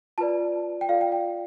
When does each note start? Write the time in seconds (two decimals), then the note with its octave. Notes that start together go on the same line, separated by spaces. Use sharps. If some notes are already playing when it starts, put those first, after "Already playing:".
0.18 F4 B4 D5 A5
0.81 G5
0.89 F4 A4 D5 F5
1.01 G5
1.12 G5